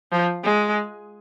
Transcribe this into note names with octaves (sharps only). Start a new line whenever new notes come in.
F3
G#3